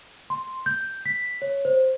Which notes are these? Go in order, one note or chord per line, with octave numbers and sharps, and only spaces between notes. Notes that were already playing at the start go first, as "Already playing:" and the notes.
C6
G6
B6
C#5
C5